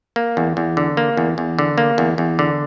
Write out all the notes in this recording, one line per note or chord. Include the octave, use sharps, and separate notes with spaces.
A#3
E2
E2
D3
A#3
E2
E2
D3
A#3
E2
E2
D3